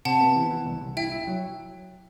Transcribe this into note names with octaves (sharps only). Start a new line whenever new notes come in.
C3 F#5 A5
B3
E3
E3
C2
C2
E4 E5 G5
E4
F#3